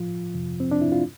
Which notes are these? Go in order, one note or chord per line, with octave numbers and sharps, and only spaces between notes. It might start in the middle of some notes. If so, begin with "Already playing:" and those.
Already playing: A2 F3 F4
F2 C3 F3
C4
D4
E4
F4